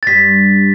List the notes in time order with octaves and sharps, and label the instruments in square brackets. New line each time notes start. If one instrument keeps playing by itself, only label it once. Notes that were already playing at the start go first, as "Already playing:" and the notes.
[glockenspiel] A6
[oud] G2 G3 [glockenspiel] B6